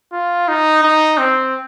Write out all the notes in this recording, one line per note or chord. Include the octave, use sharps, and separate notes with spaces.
F4
D#4
D#4
C4